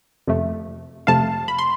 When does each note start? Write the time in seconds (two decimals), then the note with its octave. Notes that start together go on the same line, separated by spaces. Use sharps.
0.27 F2 C3 F3 A3
1.07 F2 C3 F3 A3 F5 A5
1.48 B5
1.58 C6